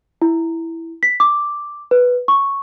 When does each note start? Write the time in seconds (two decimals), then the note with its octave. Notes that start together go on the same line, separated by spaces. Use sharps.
0.22 E4
1.03 B6
1.20 D6
1.91 B4
2.28 C#6